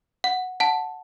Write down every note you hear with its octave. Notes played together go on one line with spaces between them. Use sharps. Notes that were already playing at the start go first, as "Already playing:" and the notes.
F#5
F#5 A5